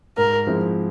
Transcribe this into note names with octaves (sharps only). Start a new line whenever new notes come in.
G#2 A#4
F3 G#3 C4 E4